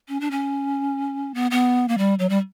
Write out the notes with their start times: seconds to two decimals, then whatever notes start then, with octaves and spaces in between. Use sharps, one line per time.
0.08 C#4
0.21 D4
0.31 C#4
1.34 B3
1.51 B3
1.88 A#3
1.98 G3
2.19 F#3
2.29 G3